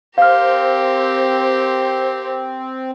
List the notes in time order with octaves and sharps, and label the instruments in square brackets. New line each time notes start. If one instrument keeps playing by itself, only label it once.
[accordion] C4 [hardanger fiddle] G4 A#4 [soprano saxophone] C5 [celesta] F5 F6